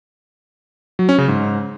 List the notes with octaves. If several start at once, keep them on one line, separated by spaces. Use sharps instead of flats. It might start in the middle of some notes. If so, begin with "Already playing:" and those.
F#3
C#4
C#3
G#2